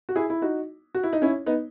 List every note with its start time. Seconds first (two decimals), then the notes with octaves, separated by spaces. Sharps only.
0.09 F#4
0.16 E4 G#4
0.30 E4
0.42 D#4 F#4
0.95 F#4
1.03 E4
1.13 D#4
1.22 C#4 E4
1.46 B3 D#4